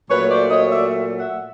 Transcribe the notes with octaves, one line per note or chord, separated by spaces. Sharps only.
A#2 F#3 A3 B4 C#5
C5 D5
C#5 D#5
D5 E5
E5 F#5